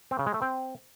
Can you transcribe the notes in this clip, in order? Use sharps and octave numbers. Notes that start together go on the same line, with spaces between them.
C4
C#3
G#3
A3
C4